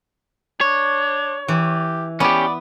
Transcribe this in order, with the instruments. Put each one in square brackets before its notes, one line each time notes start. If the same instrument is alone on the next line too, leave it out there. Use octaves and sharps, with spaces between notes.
[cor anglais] D4 [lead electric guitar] C#5
[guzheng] E3 [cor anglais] G4
[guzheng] B3 [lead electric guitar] C#4 G4 [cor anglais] D5